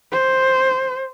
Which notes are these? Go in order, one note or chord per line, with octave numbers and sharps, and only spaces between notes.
C5